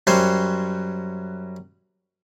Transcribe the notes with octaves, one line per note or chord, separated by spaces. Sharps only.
F#2 F#3 G3 C5 G#5 C6